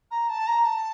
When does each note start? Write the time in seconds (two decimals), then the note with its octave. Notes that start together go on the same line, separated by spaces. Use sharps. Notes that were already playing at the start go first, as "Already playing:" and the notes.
0.11 A#5
0.29 A5
0.47 A#5
0.65 A5